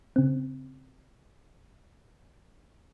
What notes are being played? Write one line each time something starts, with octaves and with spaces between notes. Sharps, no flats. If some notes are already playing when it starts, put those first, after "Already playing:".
C#3 C4